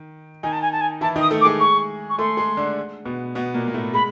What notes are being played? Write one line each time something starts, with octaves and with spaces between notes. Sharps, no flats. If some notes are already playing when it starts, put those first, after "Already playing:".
Already playing: D#3
D#3 D#4 G#5
A5
G#5
A5
G#5
E3 E4 A5
D#3 D#4
D#6
A3 A4
D6
G#3 G#4
C#6
C#6
A3 A4 C6
G#3 G#4
D3 D4
B2 B3
B2 B3
A#2 A#3
A#3
A2 A3
G#3 B5